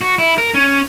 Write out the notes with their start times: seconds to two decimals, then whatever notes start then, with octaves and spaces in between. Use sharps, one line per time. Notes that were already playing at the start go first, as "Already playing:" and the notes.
0.01 F#4
0.19 E4
0.38 A#4
0.54 C#4